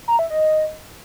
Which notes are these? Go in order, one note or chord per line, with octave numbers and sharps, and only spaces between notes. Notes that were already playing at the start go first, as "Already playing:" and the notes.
A#5
E5
D#5